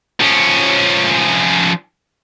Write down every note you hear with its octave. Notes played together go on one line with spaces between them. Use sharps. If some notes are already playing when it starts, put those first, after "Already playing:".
F3 C#4